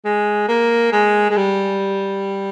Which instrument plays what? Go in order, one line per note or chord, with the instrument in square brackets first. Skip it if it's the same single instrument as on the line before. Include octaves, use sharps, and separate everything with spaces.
[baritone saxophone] G#3
A#3
G#3
G#3
G3